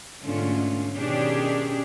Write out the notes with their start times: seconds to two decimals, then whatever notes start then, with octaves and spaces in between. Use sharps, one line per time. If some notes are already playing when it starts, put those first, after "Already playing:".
0.22 G#2 B2 D3 A3 C#4 F4
0.96 B2 D#3 C#4 D4 G4 G#4